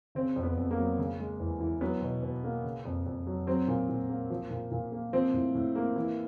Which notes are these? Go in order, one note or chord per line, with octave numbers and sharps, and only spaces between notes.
C#3 C4
F2
B3
F2
A#3
F#3
C#3
G#3
E2
E3
F#3 B3
B2
B2
A#3
C#3
F2
F2
F#3
F#3 C4
A#2
A#2
A#3
F3
A#2
A#2
A#3
F3 C4
A2
A2
A#3
E3